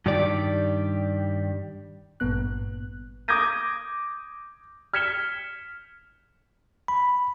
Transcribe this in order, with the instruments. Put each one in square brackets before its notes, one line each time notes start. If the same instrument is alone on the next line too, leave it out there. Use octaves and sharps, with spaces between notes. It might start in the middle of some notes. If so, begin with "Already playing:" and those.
[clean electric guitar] G2 D#3 G3 G4 D5
[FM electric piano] G#1 G2 A#2 B3 F#6
[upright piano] D6 D#6 G6 G#6 A#6 D#7
F6 G#6 B6 C#7 E7 G7
[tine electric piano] B5